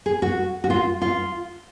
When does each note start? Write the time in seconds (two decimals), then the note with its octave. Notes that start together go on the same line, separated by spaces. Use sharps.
0.06 G#4
0.22 F#4
0.64 F#4
0.70 F4
1.02 F4